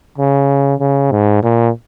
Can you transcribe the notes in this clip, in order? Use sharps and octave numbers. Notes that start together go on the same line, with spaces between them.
C#3
C#3
G#2
A#2